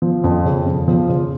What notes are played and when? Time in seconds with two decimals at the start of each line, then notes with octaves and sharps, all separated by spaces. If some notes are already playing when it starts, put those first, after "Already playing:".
0.02 F3
0.24 F2
0.45 C#3
0.66 F2
0.88 F3
1.09 C#3